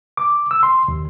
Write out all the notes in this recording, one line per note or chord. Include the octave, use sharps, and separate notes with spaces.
D6
E6
C6
D#2